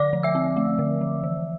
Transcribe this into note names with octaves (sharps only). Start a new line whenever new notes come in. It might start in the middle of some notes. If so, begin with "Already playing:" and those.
Already playing: D3 D5 D6
F3
E5 E6
C4
A3
D3
F3
E3